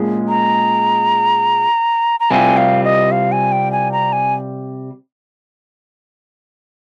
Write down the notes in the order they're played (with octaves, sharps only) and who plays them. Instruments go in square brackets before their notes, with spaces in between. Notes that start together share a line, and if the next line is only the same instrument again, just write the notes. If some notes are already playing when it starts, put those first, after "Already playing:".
Already playing: [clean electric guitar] A#2 G#3 C#4 G#4
[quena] A#5
A#5
[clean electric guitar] C3 G3 C4 F4 [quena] G#5
[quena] F5
D#5
F5
G#5
G5
G#5
A#5
G#5